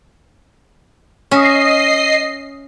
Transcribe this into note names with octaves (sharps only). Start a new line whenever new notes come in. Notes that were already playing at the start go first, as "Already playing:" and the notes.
C#4 D#5 E5 C7